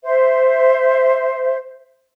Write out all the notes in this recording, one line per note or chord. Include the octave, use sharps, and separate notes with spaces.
C5 E5